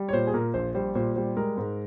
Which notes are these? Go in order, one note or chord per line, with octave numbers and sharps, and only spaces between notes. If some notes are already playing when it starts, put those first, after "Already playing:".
Already playing: G3
C#5
A#2 C5
G#4
A#2 A#4
A#1 C5
G3 C5
A#2 C5
G3 C5
G#3 A#4
G#2